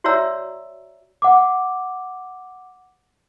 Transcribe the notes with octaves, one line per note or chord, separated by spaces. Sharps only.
F#4 C#5 D5 E5 A#5 E6
F#5 D6